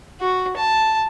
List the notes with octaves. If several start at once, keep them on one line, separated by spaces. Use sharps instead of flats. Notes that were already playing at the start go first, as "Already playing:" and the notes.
F#4
A5